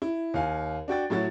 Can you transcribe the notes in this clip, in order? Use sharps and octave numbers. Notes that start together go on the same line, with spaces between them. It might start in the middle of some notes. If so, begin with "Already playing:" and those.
E4
D#2 F5 G#5
D4 F#4 G5 A6
A2 F#3 E4 F#4 A6